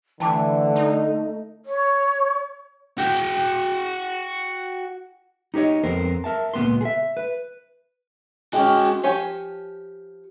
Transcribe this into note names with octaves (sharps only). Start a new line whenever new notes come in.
D3 E3 A3 G5 A5 D6
D#4
C#5
F#4 G5
D#4 G4 A#4 C#5 D#5
F2 B3 C4 A#4 C5
A#4 E5 A5
C#2 A#2 A#3 B3 B4 C6
G#4 E5
B4
G#3 C#4 F#4 G5
F3 G4 C#5 G#5